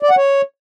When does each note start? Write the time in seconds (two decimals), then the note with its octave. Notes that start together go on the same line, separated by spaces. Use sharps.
0.03 D5
0.10 F#5
0.17 C#5